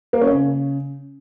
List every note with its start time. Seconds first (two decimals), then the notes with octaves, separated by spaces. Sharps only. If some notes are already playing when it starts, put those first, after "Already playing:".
0.13 A#3
0.21 C#4
0.30 C#3